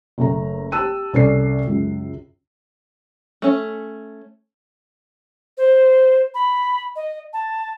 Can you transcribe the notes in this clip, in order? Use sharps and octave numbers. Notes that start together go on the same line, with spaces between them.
F#1 A3 A#5
G4 A5 E6 F#6 D#7
C2 C#4 A4 D5 C7
C#2 F#2
A3 C#4
C5
B5
D#5
A5